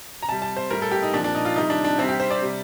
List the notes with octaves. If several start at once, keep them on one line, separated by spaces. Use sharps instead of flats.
A#5
C3 G3 A5
A5
C5
A2 G3 A#4
A4
G4
D#4
A#2 F3 D4
D4
D#4
F4
C3 D#3 G3 D#4
D4
D4
C3 G3 C4
G4
C5
D5
C3 G3